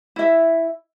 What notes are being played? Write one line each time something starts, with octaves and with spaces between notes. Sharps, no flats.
E4 E5